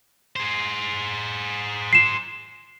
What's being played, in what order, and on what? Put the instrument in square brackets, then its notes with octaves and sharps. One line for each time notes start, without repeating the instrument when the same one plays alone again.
[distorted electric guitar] G#4 C5
[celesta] C7 E7